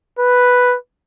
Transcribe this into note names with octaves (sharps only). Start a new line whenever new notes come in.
B4